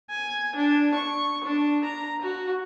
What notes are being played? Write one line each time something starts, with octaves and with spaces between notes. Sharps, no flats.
G#5
D4
C#6
D4
A#5
F#4